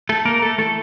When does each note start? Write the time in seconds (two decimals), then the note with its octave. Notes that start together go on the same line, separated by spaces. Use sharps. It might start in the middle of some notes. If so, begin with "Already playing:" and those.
0.09 A3 A4
0.25 A#3 A#4
0.42 A3 A4
0.58 E3 A3 A4